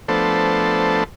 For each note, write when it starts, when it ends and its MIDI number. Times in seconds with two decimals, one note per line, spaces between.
0.08 1.04 53
0.08 1.04 57
0.08 1.04 59
0.08 1.04 62
0.08 1.04 69
0.08 1.04 72